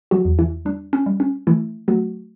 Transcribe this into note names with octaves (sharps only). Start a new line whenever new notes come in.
F#3 F#4
E2
E3 E4
G3 D4
C#4
G3
C#4
E3 A3 E4
F#3 A3 F#4